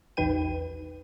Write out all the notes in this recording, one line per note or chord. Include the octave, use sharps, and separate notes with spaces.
A#1 E2 D#4 B4 G5 D#7